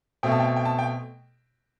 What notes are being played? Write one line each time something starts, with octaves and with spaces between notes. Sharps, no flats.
B2 A3 C4 G5
A5
G5
G5
A5
G5